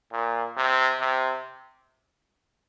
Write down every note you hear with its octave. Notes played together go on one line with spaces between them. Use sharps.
A#2
C3
C3